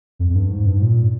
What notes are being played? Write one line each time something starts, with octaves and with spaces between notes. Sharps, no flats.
F2
F2
G2
G#2
G2
G#2
A#2